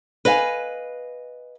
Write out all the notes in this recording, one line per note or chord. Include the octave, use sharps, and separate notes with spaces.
B4 D#5 F5 G#5